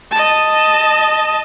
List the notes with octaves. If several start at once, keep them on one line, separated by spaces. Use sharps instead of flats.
D#5 A5